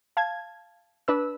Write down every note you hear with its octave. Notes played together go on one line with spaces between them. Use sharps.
F5 A5 G#6
D4 B4 E6